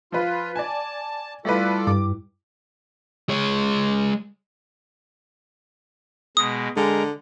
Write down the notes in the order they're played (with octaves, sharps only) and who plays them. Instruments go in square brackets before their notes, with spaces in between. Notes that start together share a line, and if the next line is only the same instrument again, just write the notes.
[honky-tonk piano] F3 B4 [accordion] F4
[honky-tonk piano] D5 G#5 [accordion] A5
[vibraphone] G3 E4 [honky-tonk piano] A3 B4 [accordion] F4 A4 D5
[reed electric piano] G2 [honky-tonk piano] D6
[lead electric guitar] G#3 C#5
[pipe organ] B2 G#3 [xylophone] D#6
[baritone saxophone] D3 [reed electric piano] G#3 G#4 [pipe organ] A#4